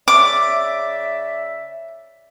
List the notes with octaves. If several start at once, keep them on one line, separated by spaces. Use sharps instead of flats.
C#3 D5 E5 D6